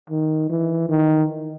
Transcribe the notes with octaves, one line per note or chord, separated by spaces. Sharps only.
D#3
E3
D#3